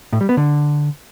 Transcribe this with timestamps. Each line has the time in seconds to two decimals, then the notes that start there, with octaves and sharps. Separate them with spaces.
0.12 A2
0.21 G3
0.29 B3
0.37 D3